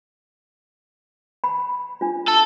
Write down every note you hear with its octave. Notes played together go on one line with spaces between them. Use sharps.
B5
D4 F4
A4